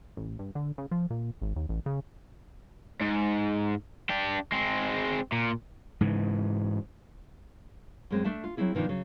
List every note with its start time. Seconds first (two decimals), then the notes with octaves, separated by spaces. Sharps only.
0.17 A1
0.39 G2
0.55 D3
0.78 C#3
0.91 F3
1.10 A#2
1.42 G#1
1.56 D#2
1.69 A1
1.86 C#3
3.01 G#2
4.10 D4 G4
4.52 G#3 C4
5.32 A#2
6.01 G#2 C#3 E3
8.11 F#2 G#3 C4
8.24 A3 D4 E5 A5
8.44 F4
8.57 F#3 A#3 C4 E4 G#4
8.75 B2 D#3 F3 D4 D#4
8.89 C#3 F#3